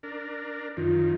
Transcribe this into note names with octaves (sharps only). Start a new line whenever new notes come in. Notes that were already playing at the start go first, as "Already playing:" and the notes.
D4 A#4
F#2 D#3 F4